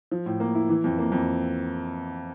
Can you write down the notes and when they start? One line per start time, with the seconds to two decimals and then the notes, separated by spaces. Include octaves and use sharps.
0.11 F3
0.26 A2
0.40 A#3
0.55 E4
0.69 E3
0.84 F2
0.99 A#3
1.12 F2